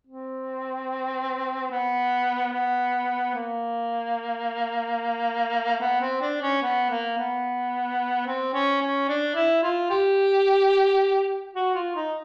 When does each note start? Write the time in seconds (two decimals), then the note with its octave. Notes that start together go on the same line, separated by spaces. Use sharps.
0.07 C4
1.70 B3
2.53 B3
3.34 A#3
5.80 B3
6.01 C4
6.21 D4
6.42 C#4
6.62 B3
6.90 A#3
7.17 B3
8.26 C4
8.53 C#4
8.81 C#4
9.09 D4
9.35 E4
9.62 F4
9.90 G4
11.55 F#4
11.75 F4
11.96 D#4